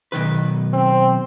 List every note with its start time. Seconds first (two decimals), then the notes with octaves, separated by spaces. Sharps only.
0.12 B1 D#3 B4
0.73 C4